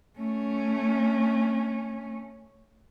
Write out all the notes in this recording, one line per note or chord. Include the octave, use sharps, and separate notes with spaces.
A3 C#4